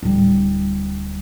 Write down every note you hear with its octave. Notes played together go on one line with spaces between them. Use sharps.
D1 G3